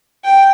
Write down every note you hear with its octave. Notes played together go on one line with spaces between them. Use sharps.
G5